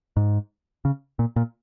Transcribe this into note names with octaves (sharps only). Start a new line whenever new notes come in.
G#2
C#3
A#2
A#2